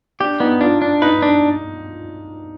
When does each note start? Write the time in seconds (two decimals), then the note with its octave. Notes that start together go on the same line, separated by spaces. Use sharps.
0.20 D4 G4
0.40 B3 D#4
0.61 D4 F4
0.82 D4
1.02 D#4 B4
1.22 D4